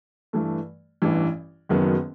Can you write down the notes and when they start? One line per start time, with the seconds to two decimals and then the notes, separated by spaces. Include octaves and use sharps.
0.33 G2 E3 A3
1.02 A1 G2 E3
1.69 F#1 F#2 D#3 F#3 B3